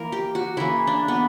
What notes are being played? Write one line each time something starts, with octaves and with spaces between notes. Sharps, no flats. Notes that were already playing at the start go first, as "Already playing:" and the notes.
Already playing: E3 A#3 A#4
G4
F#4
C#3 E3 A#3 E4
D4
B3